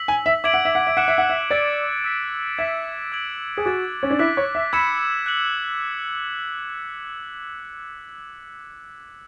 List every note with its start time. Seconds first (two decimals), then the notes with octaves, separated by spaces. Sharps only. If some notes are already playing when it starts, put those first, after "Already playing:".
Already playing: E6 B6 F#7
0.08 G#5
0.26 E5
0.44 E5 D6 G#6 D7 F#7
0.54 F#5
0.65 E5
0.75 F#5
0.87 E5
0.97 F#5 D6 F#6 C#7 E7
1.08 E5
1.18 F#5
1.29 E5
1.51 D5 E6 A6 D7
2.04 E6 B6 D7
2.58 E5 G#6 B6 E7
3.12 E6 G#6 D7 F#7
3.57 G#4
3.65 F#4 D6 F#6 A6
4.03 C#4
4.10 D4
4.19 E4 D6 F#6 B6
4.37 C#5
4.55 E5
4.73 B5 E6 G#6 C#7 E7
5.26 F#6 C#7 F#7